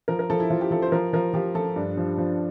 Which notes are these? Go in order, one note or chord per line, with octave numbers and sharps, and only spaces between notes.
F3 A#4
A#4
F3 A4
E4
F3 F4
G4
F3 A4
C5
F3 A#4
F3 A#4
F3 G4
F3 A4
G2
F3
F3